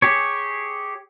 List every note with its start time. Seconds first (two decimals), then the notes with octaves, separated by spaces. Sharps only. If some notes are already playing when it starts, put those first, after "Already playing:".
0.02 G4 G#4 C#5